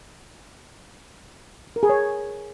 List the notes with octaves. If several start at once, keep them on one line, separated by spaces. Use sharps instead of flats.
A#4
G#4
C#5